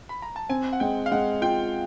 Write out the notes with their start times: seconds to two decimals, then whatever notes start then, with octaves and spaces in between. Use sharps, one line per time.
0.09 B5
0.22 A#5
0.36 A5
0.49 C4 G#5
0.73 F#5
0.80 G#3 G5
1.06 F5
1.12 G#3 F#5
1.42 F4 G5